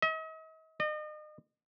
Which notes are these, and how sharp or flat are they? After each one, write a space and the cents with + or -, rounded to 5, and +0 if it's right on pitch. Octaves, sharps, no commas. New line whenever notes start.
D#5 +45
D#5 -35